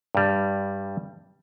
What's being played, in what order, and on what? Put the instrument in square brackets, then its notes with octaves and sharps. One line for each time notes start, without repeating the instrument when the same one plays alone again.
[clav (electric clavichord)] G2 G3